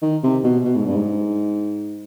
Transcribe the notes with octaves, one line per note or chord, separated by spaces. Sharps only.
D#3
C3
B2
B2
G#2
G2
G#2